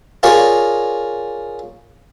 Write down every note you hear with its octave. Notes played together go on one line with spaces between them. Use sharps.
F4 G#4 A#4 C#5 D5